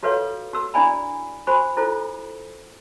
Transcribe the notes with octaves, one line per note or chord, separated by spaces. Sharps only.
F4 F#4 A4 B4 C#5 F5
F#4 E6
D4 E4 D5 G#5 B5
F#4 C5 G#5 B5 C#6
E4 F4 A4 C5